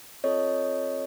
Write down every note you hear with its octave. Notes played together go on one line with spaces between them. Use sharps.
C4 F4 A4 C#5 D#5